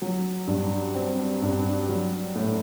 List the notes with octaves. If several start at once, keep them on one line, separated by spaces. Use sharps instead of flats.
F#3
G2
C4
G2
F#3
A2